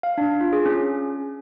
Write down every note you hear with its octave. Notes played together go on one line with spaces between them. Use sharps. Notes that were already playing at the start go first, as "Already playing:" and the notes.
F5
D4
F4
G#4
C#4